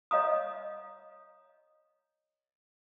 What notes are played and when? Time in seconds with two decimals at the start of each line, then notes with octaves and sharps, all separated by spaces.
0.11 C#5 D#5 F5 A#5 D#6